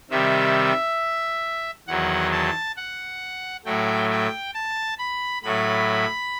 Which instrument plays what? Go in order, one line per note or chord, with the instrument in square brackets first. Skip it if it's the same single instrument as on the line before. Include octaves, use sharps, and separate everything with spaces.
[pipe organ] C3 D#3 G3 E5
E2 D#3 F#3 F#5
A5
F#5
A2 F#3 A3 G5
G5
A5
B5
A2 F#3 A3 B5